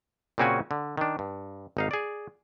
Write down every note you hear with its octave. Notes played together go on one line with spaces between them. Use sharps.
A#2 C#3 C4 C#4 F#4 G#5
D3
D#3 D4
G2
G#1 D#4 F5
G#4 D5